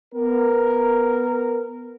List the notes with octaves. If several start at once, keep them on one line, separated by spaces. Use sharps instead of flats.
B3 A#4